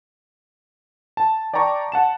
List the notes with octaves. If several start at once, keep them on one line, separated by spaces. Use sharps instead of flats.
A5
D5 G5 A5 A#5 C#6 D6
F#5 A5 E7